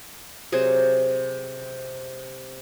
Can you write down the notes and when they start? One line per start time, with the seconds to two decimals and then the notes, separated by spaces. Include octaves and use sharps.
0.52 C3 F#3 G#4 C5